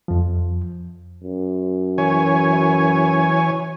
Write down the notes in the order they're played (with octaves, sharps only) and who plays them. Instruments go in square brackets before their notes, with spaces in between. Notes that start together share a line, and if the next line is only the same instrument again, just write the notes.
[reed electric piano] F2 F3
[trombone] F#2
[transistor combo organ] E3 C#5 G#5